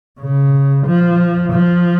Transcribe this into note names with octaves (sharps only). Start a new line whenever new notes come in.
C#3
F3
F3